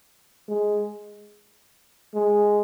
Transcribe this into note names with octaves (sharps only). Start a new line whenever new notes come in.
G#3
G#3